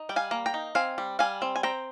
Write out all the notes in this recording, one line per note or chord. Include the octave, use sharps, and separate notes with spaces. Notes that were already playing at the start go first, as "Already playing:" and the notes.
Already playing: D#4
G3 G5
F5 G#5
A#3
G5 A#5
D#4
C4 F5 G#5
G3
G3 F5 G#5
C4
G#5
C4 G5 A#5